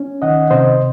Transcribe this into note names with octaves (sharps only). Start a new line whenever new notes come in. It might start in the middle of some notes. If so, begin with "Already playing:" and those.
Already playing: C#4
D#3 D#5 F#5
C3 C5 D#5